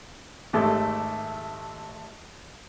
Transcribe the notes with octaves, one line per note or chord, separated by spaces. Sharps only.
G#1 A3 G4